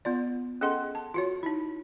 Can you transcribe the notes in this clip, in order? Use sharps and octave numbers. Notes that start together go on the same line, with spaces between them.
B3 F4 D5
C#4 G#4 A4 D#5 F#5 C6
A5
F4 F#4 C#5
D#4 E4